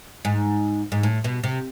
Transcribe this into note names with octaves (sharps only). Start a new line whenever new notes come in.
G#2
G#2
A2
B2
C3